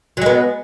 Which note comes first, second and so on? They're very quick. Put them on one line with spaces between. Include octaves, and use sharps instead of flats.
F#3 G#3 B3